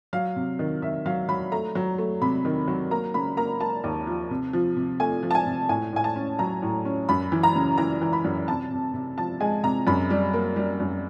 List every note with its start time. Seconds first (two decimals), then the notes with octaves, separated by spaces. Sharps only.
0.13 F#3 F5
0.36 C3
0.59 D#3
0.82 D#3 E5
1.06 F#3 F5
1.29 F#3 B5
1.52 A3 A#5
1.75 F#3
1.98 A3
2.21 C3 B5
2.45 D#3
2.68 F#3
2.91 A#3 A#5
3.14 C#3 B5
3.37 A#3 A#5
3.60 A#3 A5
3.84 D#2
4.07 F3
4.30 C3
4.53 F3
4.76 C3
5.00 A3 G#5
5.23 F3
5.31 A5
5.35 G#5
5.46 C3
5.69 A2 G#5
5.93 A2 G#5
6.04 A5
6.16 C#4
6.39 F#3 A#5
6.62 A2
6.85 C#4
7.09 F#2 B5
7.32 E3
7.43 A#5
7.55 C#3
7.78 E3 A#5
8.01 E3
8.13 B5
8.24 F#2
8.48 C3 A5
8.71 C3
8.94 C3
9.18 F3 A5
9.40 G#3 G#5
9.63 C3 A#5
9.87 F#2 B5
10.10 G3
10.33 A#3
10.56 G3
10.80 F#2